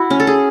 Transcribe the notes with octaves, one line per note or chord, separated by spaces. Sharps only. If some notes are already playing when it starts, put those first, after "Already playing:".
Already playing: E4 F#4
C#4
A4
G#4